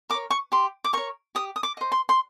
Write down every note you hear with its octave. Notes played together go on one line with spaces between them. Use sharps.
A#4 C#5 D6
C#6
G4 C6
D6
A#4 C#5 C#6
G4 D#6
D#6
D6
C5 D#5
C6
C6